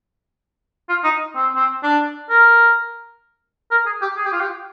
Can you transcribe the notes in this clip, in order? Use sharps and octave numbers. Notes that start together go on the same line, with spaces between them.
F4
D#4
C4
C4
D4
A#4
A#4
G#4
G4
G#4
G4
F4
G4